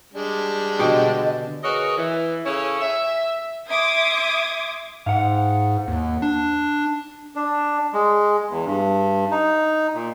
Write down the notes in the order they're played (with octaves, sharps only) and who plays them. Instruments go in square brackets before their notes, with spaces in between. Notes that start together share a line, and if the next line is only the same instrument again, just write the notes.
[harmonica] G3 G#3 D4
[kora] B2 G4 G5 [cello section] D3 [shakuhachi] D#5
[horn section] F#4 G#4 A#4 B4 C#5 D#5
E3
C#3 C#4 E4 A4 C#5
E5
[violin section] E5 C6 D6 D#6 G#6
[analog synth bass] G#2 [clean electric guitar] F5 F#5
[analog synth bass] D#2
D4
[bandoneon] D4
G#3
E2
G2
D#4
A#2